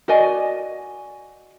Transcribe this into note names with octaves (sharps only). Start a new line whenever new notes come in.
F#4 D5 D#5 G#5